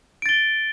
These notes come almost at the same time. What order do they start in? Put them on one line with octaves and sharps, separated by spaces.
D7 A6 G7